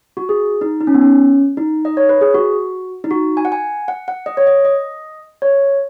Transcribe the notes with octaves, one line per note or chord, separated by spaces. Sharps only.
F#4
G#4
D#4
D#4
C#4
B3
C#4
D#4
D#5
C#5
B4
G#4
F#4
D#4
F#4
G#5
F#5
G#5
F#5
F#5
D#5
C#5
D#5
D#5
C#5